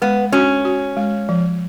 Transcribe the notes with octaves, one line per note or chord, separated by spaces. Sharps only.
G#3 B3
C#4 F#4
F#4
G#3
F3